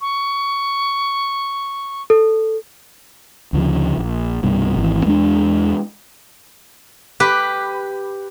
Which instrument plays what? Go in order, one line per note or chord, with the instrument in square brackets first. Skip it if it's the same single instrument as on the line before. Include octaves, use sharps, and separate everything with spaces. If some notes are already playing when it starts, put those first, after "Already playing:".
[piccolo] C#6
[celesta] A4
[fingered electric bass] D2 C#3 F3
A#1
C2 G2 B2
G#1 E3
E2 G#3 C4 D4
[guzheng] G4 B4